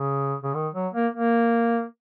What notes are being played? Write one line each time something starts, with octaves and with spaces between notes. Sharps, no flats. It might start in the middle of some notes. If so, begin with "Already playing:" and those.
Already playing: C#3
C#3
D#3
F#3
A#3
A#3